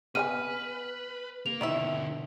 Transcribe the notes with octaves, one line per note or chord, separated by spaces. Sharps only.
B3 B4 E5 G#5 F6 D#7
A#3 F7
B2 D3 D#3 E4 E5